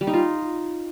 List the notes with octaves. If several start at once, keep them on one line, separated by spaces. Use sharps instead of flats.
G3
D#4
F4